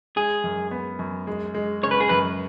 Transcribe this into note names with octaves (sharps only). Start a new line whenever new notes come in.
G#3 G#4
F#2
B3
F#2
G#3
G#3
C#3 C#5
B4
G#4
F#2 B4